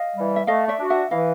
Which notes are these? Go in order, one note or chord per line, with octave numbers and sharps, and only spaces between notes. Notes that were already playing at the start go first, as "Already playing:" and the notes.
Already playing: D#5 F5
E3 G3
E5
A3 D#5 F5
D5 E5
D4 F#4
E5 F#5
E3 D#5 F5